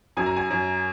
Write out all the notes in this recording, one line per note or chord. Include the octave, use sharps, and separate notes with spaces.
F#2 G#5
A#5
G#5
F#2